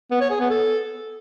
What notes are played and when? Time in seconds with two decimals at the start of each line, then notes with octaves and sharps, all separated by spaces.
0.11 B3
0.21 C#5
0.30 G#4
0.40 B3
0.50 A4